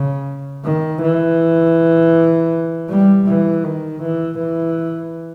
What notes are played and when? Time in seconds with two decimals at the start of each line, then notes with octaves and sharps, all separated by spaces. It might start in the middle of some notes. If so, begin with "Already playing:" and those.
Already playing: C#3
0.64 D#3
1.02 E3
2.89 G3
3.27 E3
3.64 D#3
4.02 E3
4.39 E3